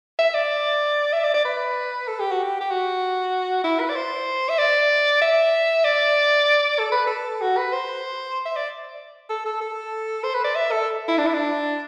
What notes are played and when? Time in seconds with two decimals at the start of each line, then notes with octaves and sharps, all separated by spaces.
0.19 E5
0.34 D5
1.13 E5
1.24 D5
1.34 D5
1.45 B4
2.08 A4
2.20 G4
2.31 F#4
2.43 G4
2.61 G4
2.70 F#4
3.64 E4
3.80 B4
3.89 D5
3.96 C5
4.49 E5
4.59 D5
5.21 E5
5.85 D5
6.79 A4
6.92 B4
7.07 A4
7.41 F#4
7.57 B4
7.73 C5
8.46 E5
8.56 D5
9.30 A4
9.46 A4
9.61 A4
10.24 C5
10.34 B4
10.44 D5
10.55 E5
10.71 A4
11.08 E4
11.18 D4
11.26 E4
11.34 D4